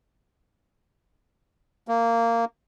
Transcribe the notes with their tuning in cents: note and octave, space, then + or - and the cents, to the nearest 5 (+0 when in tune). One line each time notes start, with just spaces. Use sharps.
A#3 -15